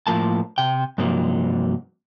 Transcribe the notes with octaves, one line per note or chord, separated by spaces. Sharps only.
A2 C#3 F3 A#3 A5
C3 G5
G2 C3 F3 F#3 A#3 D#4